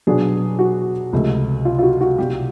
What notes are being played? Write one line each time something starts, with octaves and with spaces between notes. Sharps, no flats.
B2 F#3 B3 D4 G#4
F#4
C#2 C3 F3 A3
F4
F4
F#4
F#4
C2 B2 G3 G4